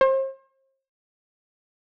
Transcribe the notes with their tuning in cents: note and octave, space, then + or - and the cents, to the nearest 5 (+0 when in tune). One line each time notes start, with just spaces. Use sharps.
C5 +40